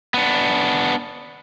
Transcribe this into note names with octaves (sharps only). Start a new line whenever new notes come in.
B3 D4